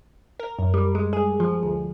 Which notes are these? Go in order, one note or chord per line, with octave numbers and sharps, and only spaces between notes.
A#4
F#2
G3
G#3
G#4
F3
D2